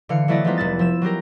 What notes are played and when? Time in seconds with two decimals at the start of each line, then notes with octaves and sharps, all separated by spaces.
0.09 D3 E3 F5 C#7
0.28 E3 F#3 A3 E4 D5 D#5
0.45 F3 G3 G#3 B3 D#4 F4
0.57 F1 E4 A6
0.79 F3 E6 E7
1.02 F#3 F4 G4 A#4